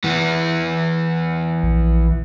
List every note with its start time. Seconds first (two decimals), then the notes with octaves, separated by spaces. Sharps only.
0.04 E3 B3
1.63 A#1